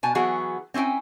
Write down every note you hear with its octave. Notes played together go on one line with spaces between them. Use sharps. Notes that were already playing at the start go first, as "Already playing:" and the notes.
B2 G#5 A5
E3 F#3 B3 F#4 G#4
C4 C#4 E4 G5 G#5